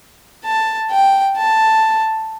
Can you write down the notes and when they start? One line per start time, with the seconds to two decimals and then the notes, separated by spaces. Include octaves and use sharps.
0.44 A5
0.90 G5
1.37 A5